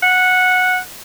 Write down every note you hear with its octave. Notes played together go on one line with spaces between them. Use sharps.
F#5